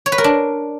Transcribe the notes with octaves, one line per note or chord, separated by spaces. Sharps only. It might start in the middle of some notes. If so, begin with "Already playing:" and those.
C#5
B4
A#4
D4